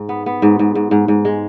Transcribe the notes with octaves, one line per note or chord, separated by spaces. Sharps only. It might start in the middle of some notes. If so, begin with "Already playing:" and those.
Already playing: G#2
B3
B3
G#2
G#2
G#2
G#2
G#2
G#3